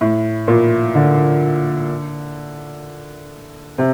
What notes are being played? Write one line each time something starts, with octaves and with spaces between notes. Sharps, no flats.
A2
A#2
D3
C3